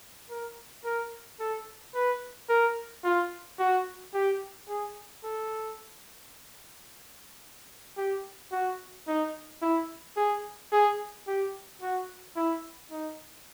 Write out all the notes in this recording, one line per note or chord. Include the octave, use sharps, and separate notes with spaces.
A#4
A#4
A4
B4
A#4
F4
F#4
G4
G#4
A4
G4
F#4
D#4
E4
G#4
G#4
G4
F#4
E4
D#4